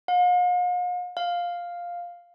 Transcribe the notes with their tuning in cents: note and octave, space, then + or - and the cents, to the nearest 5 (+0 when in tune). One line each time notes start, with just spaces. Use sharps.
F5 +45
F5 +5